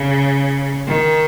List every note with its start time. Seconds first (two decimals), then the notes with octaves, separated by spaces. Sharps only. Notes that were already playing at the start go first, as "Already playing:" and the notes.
Already playing: C#3
0.87 D#3